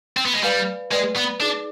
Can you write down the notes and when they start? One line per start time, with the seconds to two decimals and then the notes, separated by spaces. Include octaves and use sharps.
0.17 C4
0.25 B3
0.34 G#3
0.43 G3 B4 D5 F5 G#5 B5
0.92 G#3 B4 D5 G5
1.16 B3
1.40 D4 D#4 G#4 D5